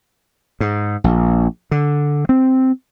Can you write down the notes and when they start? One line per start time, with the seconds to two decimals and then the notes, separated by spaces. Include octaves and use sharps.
0.60 G#2
1.04 A#1
1.71 D3
2.29 C4